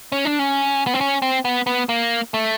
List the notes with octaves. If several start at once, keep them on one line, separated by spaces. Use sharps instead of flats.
C#4
D4
C#4
B3
C4
C#4
C4
B3
B3
A#3
A3